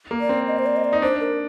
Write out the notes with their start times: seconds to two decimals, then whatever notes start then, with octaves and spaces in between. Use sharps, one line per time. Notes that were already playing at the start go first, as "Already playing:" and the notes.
0.11 A#3
0.20 D5
0.29 C4
0.47 D#5
0.59 C5
0.66 D5
0.76 D#5
0.84 D5
0.93 D#4
1.02 D4 C5
1.20 A#4